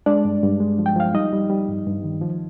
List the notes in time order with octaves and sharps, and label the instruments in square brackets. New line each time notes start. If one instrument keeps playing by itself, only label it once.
[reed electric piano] G#3 D4 D5
G2
G2
G#3
F3
G5
F3 F5
G3 D#4 D#5
G3
G3
G2
G2
D#3
F3